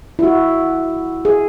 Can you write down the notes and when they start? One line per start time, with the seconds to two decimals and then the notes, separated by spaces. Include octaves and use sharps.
0.19 E4
0.23 F#4
1.25 G#4